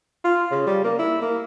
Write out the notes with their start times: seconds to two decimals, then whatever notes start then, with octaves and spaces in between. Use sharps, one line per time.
0.24 F4
0.51 C#3
0.66 G3
0.84 A#3
0.98 E4
1.22 A#3